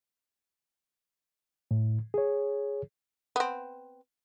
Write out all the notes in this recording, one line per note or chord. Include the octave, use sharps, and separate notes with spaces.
A2
G#4 C#5
B3 C4